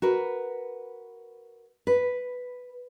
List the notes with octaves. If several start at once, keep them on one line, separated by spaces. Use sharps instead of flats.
F#4 A#4 B4
B4